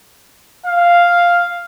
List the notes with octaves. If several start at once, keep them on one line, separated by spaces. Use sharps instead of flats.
F5